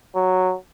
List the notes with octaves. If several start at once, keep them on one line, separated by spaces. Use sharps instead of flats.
F#3